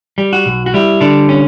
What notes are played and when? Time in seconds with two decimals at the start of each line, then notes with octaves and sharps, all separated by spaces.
0.18 G3
0.33 F#4
0.46 B1
0.66 F#4
0.74 G3 E4
1.01 D3 D4
1.29 C#4